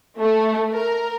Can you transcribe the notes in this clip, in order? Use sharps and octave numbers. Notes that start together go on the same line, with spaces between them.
A3
A#4